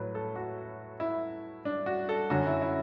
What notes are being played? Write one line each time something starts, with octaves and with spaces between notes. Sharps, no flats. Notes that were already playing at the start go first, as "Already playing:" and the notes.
Already playing: A2 F#3 B4
A4
F#4
E4
D4
F#4
A4
F#2 D3 F#3 F#4
E4
E4